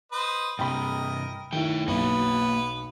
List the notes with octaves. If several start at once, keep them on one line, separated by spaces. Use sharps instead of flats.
B4 C5 D#5
G2 C3 A#4 D#5 G5 B5
D#3 A3 E4 G5
B1 B2 A#3 B3 B4 C#5